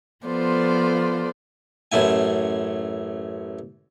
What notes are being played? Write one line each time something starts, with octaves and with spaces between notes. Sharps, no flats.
F3 B3 F4 A4 C5 D5
A1 F#2 A3 E4 G#5